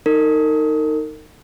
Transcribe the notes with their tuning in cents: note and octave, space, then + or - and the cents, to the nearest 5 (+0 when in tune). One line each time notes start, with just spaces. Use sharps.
D#4 +0 A#4 -35